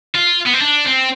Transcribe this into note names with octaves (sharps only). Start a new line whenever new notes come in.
F4
B3
C4
D4
C4